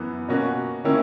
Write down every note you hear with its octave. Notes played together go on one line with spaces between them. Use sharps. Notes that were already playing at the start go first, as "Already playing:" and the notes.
Already playing: F#2 E3 B3
B2 A#3 C#4 F#4
D#3 A#3 C#4 E4